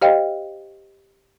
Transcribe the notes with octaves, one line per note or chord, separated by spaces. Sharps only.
G4 C5 D#5 F5 G5